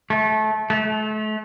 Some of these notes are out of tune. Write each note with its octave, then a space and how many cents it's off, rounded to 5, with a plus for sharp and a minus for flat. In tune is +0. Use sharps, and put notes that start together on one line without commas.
A3 -25
A3 -35